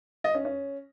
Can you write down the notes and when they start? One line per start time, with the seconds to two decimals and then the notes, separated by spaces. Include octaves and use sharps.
0.24 D#5
0.35 C#4
0.45 C#4